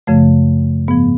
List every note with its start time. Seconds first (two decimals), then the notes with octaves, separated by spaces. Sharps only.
0.07 F#2 C#3 F3 A3
0.88 G#2 F3 B3